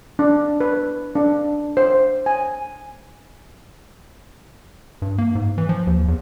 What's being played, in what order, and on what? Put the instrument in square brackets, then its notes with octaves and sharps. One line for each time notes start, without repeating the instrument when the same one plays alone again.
[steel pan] D4
B4
D4
C5
G#5
[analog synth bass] G2
A#3
G#2
E3
F3
D#2
E2